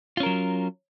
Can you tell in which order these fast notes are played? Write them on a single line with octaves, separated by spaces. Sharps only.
F4 C#4 A#4 F#3